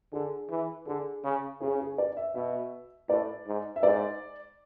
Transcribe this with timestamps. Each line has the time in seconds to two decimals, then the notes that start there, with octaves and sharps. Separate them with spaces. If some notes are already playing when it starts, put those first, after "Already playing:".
0.13 D3 G#4
0.50 E3
0.87 D3 G#4
1.24 C#3
1.61 C#3 G#4
1.80 G#4
1.98 D5
2.17 E5
2.35 B2 E5
3.09 A2 D5
3.47 G#2
3.76 E5
3.83 G#2 D5